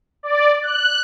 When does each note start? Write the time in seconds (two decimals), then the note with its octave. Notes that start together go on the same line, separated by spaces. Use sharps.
0.23 D5
0.62 F#6